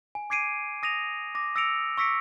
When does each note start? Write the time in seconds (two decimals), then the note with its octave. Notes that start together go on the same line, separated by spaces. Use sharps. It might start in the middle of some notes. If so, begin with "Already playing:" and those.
0.15 G#5
0.30 D6 G#6 C7 D7 D#7
0.83 D#6 A#6 D#7 F7
1.35 D6 A#6
1.56 E6 A#6 C#7 D7 F7
1.98 C#6 E6 A#6 B6 C#7 D7